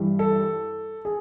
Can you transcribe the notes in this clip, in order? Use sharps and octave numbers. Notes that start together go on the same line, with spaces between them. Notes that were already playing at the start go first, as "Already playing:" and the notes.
Already playing: G2 E3 G3
A4
G#4